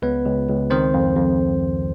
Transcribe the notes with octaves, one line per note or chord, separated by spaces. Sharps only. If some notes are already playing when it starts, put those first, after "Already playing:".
C#2 B3 B4
C#2
C#2
D#3 C4 C5
F2
F2